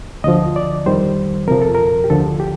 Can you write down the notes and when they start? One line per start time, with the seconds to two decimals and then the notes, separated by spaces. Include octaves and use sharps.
0.24 D2 D3 F3 D#5
0.56 D5
0.86 F2 D#3 G3 C5
1.47 F2 C3 F3 A#4
1.62 A4
1.75 A#4
2.04 G4
2.10 D2 D3 F3 A4
2.40 G4